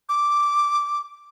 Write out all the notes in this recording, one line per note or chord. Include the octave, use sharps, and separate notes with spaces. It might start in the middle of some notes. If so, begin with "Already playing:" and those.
D6